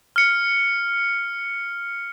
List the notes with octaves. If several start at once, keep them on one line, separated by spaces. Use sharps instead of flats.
F6 C#7